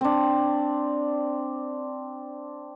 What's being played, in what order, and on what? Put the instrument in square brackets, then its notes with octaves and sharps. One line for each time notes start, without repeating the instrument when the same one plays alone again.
[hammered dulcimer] C4 D4